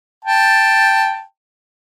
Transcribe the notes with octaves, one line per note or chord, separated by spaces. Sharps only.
G5 A5